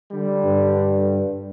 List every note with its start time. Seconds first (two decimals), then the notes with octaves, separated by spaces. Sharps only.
0.12 D3 G3
0.45 G2